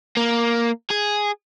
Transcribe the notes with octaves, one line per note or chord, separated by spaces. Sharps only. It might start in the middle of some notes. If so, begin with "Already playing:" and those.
A#3
G#4